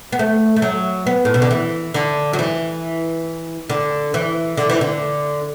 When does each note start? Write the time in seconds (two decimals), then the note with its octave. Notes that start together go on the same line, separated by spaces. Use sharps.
0.12 B3
0.19 A3
0.56 A3
0.62 F#3
1.07 B3
1.25 A2
1.34 B2
1.42 D3
1.51 E3
1.94 D3
2.33 F#3
2.39 E3
3.69 D3
4.14 E3
4.57 D3
4.70 E3
4.81 D3